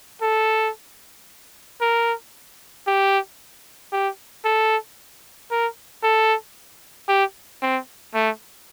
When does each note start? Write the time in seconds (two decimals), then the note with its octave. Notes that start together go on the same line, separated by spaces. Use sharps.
0.22 A4
1.81 A#4
2.87 G4
3.93 G4
4.45 A4
5.51 A#4
6.03 A4
7.08 G4
7.62 C4
8.14 A3